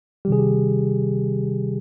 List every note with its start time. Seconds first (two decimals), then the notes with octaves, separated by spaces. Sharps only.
0.25 G3 G4
0.28 C3 D#3 G#4
0.39 G4